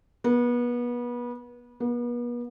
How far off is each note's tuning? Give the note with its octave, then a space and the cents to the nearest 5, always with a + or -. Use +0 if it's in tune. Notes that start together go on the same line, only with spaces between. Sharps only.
B3 -30
B3 -40